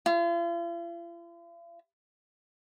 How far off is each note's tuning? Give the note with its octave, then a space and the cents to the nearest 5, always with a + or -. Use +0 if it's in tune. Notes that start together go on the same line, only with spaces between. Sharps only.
F4 -45